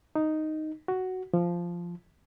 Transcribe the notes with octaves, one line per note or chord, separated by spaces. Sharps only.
D#4
F#4
F3